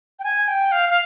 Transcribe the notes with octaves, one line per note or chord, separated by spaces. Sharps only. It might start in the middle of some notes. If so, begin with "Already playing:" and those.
G5
G#5
G5
F5
F5